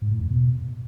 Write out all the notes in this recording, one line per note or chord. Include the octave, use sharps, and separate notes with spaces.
G#2
A2
F2
B2